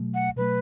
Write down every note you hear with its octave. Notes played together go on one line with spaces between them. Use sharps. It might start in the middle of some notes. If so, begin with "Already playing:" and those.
Already playing: B2 F#3 A3
F#5
B2 F#3 A3 B4